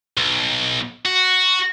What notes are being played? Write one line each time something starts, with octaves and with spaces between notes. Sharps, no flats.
B1
F#4